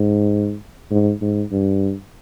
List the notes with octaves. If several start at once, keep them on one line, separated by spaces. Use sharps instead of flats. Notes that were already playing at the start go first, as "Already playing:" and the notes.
Already playing: G#2
G#2
G#2
G2